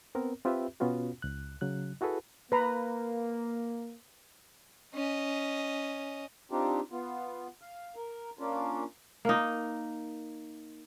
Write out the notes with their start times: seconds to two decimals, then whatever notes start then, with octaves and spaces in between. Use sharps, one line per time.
0.15 B3 C4 A#4
0.45 C4 F4 G4 B4 E5
0.80 B2 B3 C#4 F4 F#4
1.22 C#2 F#6
1.61 C#3 F#3 F#6
2.01 E4 F#4 G#4 A4 B4
2.52 A#3 B4 A#5 B5
4.94 C#4 D#5
6.51 C4 D4 D#4 F4 G4
6.92 B3 F4
7.61 F5
7.96 A#4
8.39 A#3 C#4 D4 F4
9.25 A#3 D#4